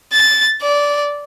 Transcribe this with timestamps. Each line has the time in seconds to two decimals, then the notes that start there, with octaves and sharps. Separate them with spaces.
0.13 A6
0.62 D5